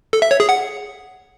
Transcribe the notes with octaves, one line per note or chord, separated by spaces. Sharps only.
A4
E5
C#5
G#4
F#5